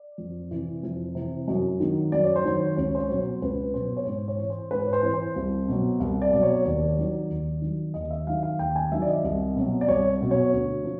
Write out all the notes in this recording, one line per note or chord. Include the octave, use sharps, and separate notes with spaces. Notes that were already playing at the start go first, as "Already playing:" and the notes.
Already playing: D5
F2
C3 E3
F2
C3 E3
F#2
D#3 F#3
F#2 D5
C#5
C5
D#3 F#3 C#5
C#2 C#5
C5
C#5
B2 F#3
C5
C#2 B4
B2 F#3 C5
C#5
G#2 C5
C#5
E3
C5
G#2 B4
C#5
C5
E3
C5
C2
B2 F#3
C2
D5
B2 F#3
C#5
D#2 D5
D#3 F#3
D#2
D#3 F#3
D#2 D#5
E5
D#3 F#3 F5
F5
D#2 G5
G#5
D#3 F#3 E5
D5
D#5
C2
B2 F#3
D5
C2 C#5
B2 F#3
C#5
D2
F3